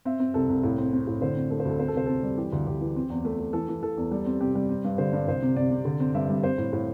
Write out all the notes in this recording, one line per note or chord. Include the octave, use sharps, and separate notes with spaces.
C4 E5
C4
C2 A4
C2
A2
C4
C4
A2
D3 C5
C4
A3 A4
C5
D2 A4
C4 C5
A4
C2 C5
C4 A4
G3
E3 G4
D2
D2 G4
E3
C4
E2
A3
A3
E3 A4
E3
E3 A4
E2
G3
C4
C3 G4
G3
C4
G2
D3 C5
G2
C2 C5
C3
C3 D5
C3
D3
C4
G2 E5
G3
C4 C5
A2
A2